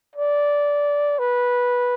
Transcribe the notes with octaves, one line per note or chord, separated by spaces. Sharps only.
D5
B4